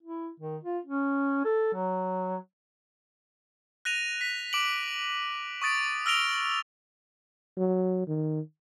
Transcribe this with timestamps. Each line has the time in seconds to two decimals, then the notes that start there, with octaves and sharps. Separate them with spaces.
0.03 E4
0.40 D#3
0.63 F4
0.85 C#4
1.45 A4
1.74 F#3
3.85 F#6 A#6 D#7 F7
4.21 B6
4.53 D6 D7 F#7
5.62 C#6 D#6 A6 D7
6.06 E6 F6 A#6 D7 F7 G7
7.57 F#3
8.07 D#3